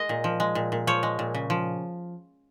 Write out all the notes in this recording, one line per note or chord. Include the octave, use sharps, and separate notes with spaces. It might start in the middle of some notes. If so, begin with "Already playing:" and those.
Already playing: G#3 D#5
A#2
F3
G#3
A#2
A#2
F3 C#5
G#3
A#2
C#3
F3